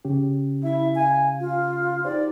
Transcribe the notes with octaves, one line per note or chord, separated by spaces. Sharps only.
C#3 C#4 G4
E4 E5
F5 G#5
F4
D#4 G4 C5 D5